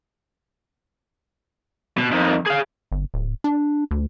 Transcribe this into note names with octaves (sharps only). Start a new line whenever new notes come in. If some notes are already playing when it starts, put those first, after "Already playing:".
B2
F2 D#3
G#4 F5
G1
D1
D4
D2